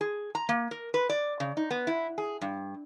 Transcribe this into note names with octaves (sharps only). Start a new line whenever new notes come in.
G#4
A#5
A#3
A#4
B4
D5
C#3
D#4
B3
E4
G#4
G2